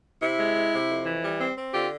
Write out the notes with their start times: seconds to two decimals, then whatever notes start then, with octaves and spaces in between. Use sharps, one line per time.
0.21 C3 E4
0.39 G#3
0.56 C3
0.72 C3
0.89 F2
1.06 E3
1.23 G3
1.39 C4
1.57 C4
1.73 D3 F4 G4